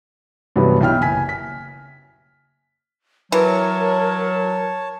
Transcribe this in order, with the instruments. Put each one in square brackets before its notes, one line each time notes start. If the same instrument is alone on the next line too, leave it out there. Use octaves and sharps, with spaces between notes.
[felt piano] G2 C3 E3 F#3 G3 B3
B1 E4 G5 F6
F#1 G#5 B6
B6
[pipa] E3 [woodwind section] F#3 [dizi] A#4 [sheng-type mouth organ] C#5 A5